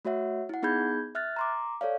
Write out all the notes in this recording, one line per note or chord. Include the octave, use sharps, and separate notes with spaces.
A3 F#4 C#5 E5 F#5
E4 F#5
B3 D#4 G#4 B5 G6 G#6
E5 F6 F#6 A6
A#5 C6 D6
A4 C#5 D5 F5